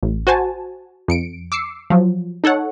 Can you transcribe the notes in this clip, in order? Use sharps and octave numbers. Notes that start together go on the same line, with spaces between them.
A1
F#4 C5 G#5 A5
F2 C#7 D7
D6 E6 C7 C#7
F3 F#3
D#4 A4 C#5 F#5